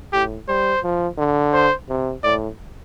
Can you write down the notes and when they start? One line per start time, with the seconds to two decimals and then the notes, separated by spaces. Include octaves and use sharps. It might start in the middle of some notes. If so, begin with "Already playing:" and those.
0.13 A2 G4
0.48 G3 C5
0.83 F3
1.18 D3
1.53 C5
1.89 C3
2.23 A2 D5